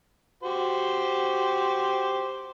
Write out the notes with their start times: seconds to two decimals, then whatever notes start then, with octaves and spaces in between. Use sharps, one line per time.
0.43 F#4 G4 C5